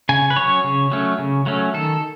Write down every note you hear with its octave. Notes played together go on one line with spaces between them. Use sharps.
C#3 G#5
B4
F#3 C#4 C#5
C#3
F#3 A3 C#4
C#3
F#3 A3 C#4
D#3 A4